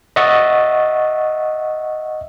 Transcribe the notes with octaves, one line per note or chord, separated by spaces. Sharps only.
D#5 E5 F#5 C#6 A6